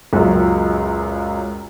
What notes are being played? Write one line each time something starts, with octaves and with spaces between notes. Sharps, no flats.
C#2 F#2 A#2